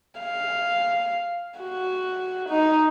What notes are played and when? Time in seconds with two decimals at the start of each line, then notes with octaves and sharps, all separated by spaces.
0.20 F5
1.59 F#4
2.49 D#4